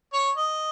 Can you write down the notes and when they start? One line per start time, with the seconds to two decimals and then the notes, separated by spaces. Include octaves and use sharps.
0.14 C#5
0.36 D#5